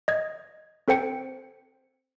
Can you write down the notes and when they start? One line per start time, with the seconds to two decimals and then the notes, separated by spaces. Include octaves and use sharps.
0.08 D#5 G#6
0.88 C4 A4 C5 G5 C#7